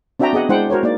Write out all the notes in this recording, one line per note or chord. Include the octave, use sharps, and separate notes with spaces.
C4 D4 F#4 E5 G5 A#5
B3 G#4 D#5 F#5
G#3 D4 E4 C5 F#5 G5
F#4 A#4 C5 C#5
A#3 D#4 D5